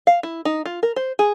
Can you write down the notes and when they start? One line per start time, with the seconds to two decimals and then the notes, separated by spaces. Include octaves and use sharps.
0.07 F5
0.23 E4
0.45 D#4
0.66 F4
0.83 A#4
0.96 C5
1.19 G#4